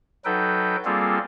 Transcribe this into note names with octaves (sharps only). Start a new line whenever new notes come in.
F#3 D#4 A4 B4 G5
G3 A#3 C4 F4 G#4 A4